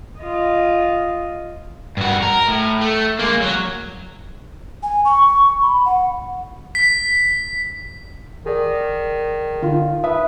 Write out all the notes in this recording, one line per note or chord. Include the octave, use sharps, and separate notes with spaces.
F4 D#5
G2 F#4
A#4
A2
A3
G#3 A#3
F#3 F#4
G#5
C#6
B5
F#5
B6
D#3 G#4 D5
D3 D#4 F4
B4 E5 D#6